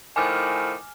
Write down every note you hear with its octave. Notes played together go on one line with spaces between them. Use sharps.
A2 D#3 F3 G#5 D6 F6